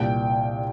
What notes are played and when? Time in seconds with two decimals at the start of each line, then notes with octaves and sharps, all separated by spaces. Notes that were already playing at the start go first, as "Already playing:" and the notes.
Already playing: C2 A#2 G5